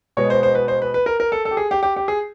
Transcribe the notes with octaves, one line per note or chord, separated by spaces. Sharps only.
B2 G#3 B3 C#5
C5
C5
B4
C5
B4
B4
A#4
A#4
A4
A4
G4
G#4
G4
G4
G4
G#4